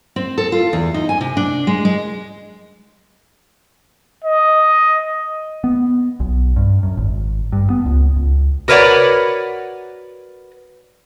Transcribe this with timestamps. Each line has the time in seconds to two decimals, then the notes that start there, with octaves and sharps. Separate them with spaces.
0.16 C4
0.38 A4
0.52 F4
0.73 E2
0.94 D#4
1.09 G#5
1.21 C3
1.37 D4
1.67 G#3
1.85 G#3
4.24 D#5
5.64 B3
6.20 B1
6.56 G2
6.83 F#2
6.97 G#1
7.52 G2
7.70 B3
7.86 C#2
8.16 C#2
8.68 F#4 A#4 B4 C#5 D5 F#5